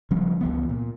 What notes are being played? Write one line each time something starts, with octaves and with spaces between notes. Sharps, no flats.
C#3 F3 G3 C#4
C#2 E3 B3
A#2